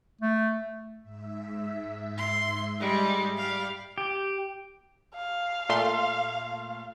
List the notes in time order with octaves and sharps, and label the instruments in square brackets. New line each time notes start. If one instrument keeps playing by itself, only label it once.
[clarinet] A3
[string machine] G#2 E5
[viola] C6
G3 G#3
G3 F5
[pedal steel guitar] G4
[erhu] F5
[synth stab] A#2 A3 C6